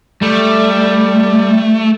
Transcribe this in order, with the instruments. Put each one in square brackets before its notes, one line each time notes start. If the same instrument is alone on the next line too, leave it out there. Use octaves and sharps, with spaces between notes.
[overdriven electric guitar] G3 [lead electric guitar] A3